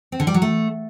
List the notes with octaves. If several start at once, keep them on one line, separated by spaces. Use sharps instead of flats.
C4
D3
G3
F#3
A3